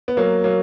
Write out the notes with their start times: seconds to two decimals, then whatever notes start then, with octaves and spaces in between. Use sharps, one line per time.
0.08 B3
0.17 F#3 A#3
0.44 F#3 A#3